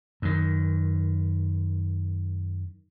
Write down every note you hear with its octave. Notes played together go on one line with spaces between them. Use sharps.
F#2 D#3